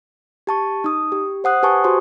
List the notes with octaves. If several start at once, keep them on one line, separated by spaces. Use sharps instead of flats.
G4 A5 C#6
D#4 D#6
G4
C5 F#5 D#6 F#6
G4 B4 G#5 A5 C#6 D#6
F#4 G4 C5 C6